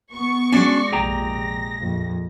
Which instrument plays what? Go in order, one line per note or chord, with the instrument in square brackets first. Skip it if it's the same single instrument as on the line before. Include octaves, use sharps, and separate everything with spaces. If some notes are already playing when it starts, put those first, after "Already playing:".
[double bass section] B3 [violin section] C#6
[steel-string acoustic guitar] G#3 D5 [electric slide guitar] C#4 D4 F#4
[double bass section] A#1 F2 C3 [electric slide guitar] G#4 G5 A#5 [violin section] A#6
[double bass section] A#1 F2